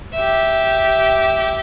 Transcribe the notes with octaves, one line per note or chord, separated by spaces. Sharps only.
G4 E5